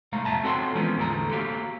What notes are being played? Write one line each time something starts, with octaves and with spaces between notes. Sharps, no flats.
C2 G#2 A3 F5 A#5
F2 A#2 E5 A5 A#5
C4 F#4 A4 C#5 F#5 C6
E3 F3 G#3 B3 C#4
E2 A2 D3 A4 A#5
A#3 F#4 G4 F5